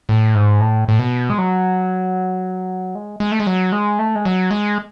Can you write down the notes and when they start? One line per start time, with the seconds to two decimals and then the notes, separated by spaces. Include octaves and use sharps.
0.09 A2
0.35 G#2
0.60 A2
0.88 A2
0.99 B2
1.30 G#3
1.38 F#3
2.95 G#3
3.20 G#3
3.32 A3
3.40 G#3
3.47 F#3
3.72 G#3
3.99 A3
4.15 G#3
4.25 F#3
4.51 G#3